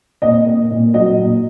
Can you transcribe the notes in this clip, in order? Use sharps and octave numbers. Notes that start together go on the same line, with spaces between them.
A#2 D#5
A#3
A#2
F#3 D#5
A#2